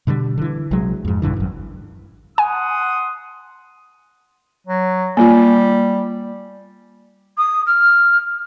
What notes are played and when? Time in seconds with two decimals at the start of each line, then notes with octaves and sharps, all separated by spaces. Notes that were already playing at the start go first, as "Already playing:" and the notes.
0.07 B2 D3 E3 G3
0.38 D3 E3
0.71 A#1 C3 F#3 G#3
1.05 F2 G#2
1.22 B1 G2 D3 E3
1.37 G#1 F#2
2.38 F#5 G#5 C6 D#6
4.67 F#3
5.17 G3 A#3 F4
7.37 D#6
7.66 F6